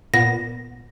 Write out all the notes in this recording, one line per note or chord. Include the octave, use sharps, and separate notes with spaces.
A#2 B3 A#6